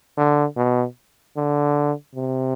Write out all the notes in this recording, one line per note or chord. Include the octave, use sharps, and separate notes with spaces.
D3
B2
D3
C3